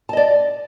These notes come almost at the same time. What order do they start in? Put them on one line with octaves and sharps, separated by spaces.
A5 D#5 D5